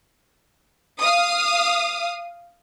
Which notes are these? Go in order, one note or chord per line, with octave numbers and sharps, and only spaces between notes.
F5 D#6